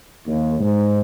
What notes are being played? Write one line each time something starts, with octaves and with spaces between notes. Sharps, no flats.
D#2
G#2